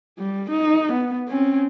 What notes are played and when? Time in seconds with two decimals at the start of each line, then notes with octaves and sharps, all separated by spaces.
0.19 G3
0.51 D#4
0.93 B3
1.28 C4 C#4